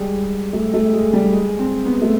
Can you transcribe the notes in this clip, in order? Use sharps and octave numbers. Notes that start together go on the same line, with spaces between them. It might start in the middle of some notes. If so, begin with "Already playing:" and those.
Already playing: G3 G#3
A3
A3
G#3
G3
G#3
C4
B3
A3